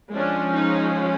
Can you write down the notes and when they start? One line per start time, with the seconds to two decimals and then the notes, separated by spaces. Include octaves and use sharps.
0.13 F3 G#3 C#4 D4
0.54 D#4